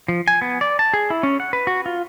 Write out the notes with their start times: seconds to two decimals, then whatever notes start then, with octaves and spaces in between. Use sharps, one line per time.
0.08 F3
0.28 G#5
0.42 B3
0.61 D5
0.79 A5
0.94 G#4
1.10 E4
1.23 C#4
1.40 F#5
1.53 B4
1.67 F#4
1.86 F4